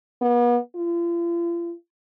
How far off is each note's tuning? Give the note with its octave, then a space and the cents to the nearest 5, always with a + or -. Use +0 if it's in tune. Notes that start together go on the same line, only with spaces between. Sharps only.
B3 -40
F4 -40